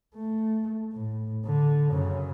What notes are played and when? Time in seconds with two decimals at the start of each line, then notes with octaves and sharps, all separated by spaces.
0.15 A3
0.92 A2
1.45 D3
1.90 F#2 C#3